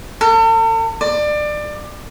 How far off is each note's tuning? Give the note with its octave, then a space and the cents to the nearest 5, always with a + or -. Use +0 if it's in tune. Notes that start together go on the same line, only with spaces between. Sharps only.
A4 +45
D5 +25